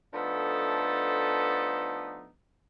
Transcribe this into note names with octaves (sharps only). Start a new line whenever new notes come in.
F3 A3 B3 D4 D#4 A4